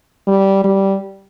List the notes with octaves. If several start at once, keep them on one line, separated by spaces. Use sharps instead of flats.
G3
G3